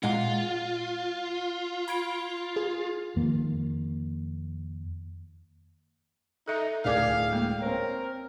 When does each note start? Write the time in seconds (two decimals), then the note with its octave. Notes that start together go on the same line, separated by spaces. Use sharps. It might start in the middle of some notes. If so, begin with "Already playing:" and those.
0.03 A#2 G#3 F4 F#5
1.88 B5 G#6 D7
2.56 G#4
3.16 F2 D#3 A#3
6.48 D#4 A4 E5
6.85 D1 G#4 A#4 D5 F5 D6 G#6
7.30 G#3 A#3
7.62 C4 A#4 C#5